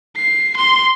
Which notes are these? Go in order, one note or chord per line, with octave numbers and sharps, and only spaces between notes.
C7
C6